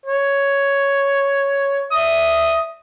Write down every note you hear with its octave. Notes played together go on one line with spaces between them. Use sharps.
C#5
E5 D#6